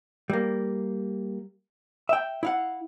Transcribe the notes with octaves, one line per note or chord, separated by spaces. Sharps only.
G3 A#3
E5 G5
E4 F5 F#5